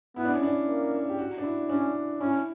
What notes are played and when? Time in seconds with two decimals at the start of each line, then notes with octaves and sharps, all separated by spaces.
0.16 B3 E4
0.25 D4
0.35 C#4
0.43 D4
0.67 A#3
1.10 G4
1.19 F#4
1.38 D4
1.43 E4
1.69 C#4 D4
2.20 C#4 E4